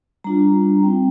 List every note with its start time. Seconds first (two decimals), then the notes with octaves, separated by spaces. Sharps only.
0.24 G3 D4 F4 A#5
0.83 G3 C4 D#4 G5